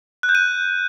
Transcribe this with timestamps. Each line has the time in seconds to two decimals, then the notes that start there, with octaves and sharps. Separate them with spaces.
0.23 F#6
0.29 G6
0.35 D#7